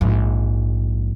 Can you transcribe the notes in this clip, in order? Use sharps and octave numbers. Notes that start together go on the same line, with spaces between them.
A#1 G#2